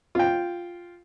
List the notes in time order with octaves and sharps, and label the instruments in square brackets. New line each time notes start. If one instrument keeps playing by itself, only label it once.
[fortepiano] F4 G5